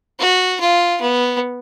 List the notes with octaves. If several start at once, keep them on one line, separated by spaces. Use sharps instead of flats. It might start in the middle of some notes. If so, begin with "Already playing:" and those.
F#4
F4
B3